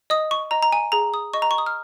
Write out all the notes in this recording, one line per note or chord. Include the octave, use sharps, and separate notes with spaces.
D#5 D#6
C#6
D#5 A#5
A#5
G#5
G#4 A#5
D#6
D#5 C#6
A#5
C#6
D#6
F6